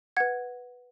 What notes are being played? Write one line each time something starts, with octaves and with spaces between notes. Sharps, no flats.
B4 F#5 G#6